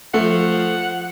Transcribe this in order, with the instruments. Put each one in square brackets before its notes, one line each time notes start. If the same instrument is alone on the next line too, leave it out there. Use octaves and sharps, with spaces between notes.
[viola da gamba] F3 [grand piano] A3 [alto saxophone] F#5